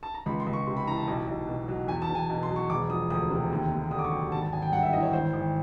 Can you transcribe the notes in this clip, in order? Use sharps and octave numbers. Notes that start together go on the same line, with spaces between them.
A5
A#5
C#2 B5
C6
C#2
C#6
C3 C6
B5
E3 A#5
A5
B1
B1
B2
F#3
E2 G#5
A5
E2
G#5
B2
C6
F#3
C#6
E1 D6
F3 D#6
D2 D#6
C3
D#2
D#2
D3 D#6
D6
C#6
F#3
G#1 A5
A5
G#1 G#5
G5
G2 F#5
E5
E3 D#5
C#5
G#1 C5
G#1